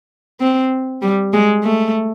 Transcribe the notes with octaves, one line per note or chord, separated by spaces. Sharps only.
C4
G3
G#3
A3